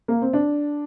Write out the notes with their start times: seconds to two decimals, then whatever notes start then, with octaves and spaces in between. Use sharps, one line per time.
0.08 A#3
0.22 C4
0.33 D4